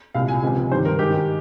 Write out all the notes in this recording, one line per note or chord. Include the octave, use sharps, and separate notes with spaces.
C2 A#2 G#3 F5
G#5
C#2 C3 F3 G#3
G2 D#3 G3 C5
A#4
G#2 D#3 G#3 G4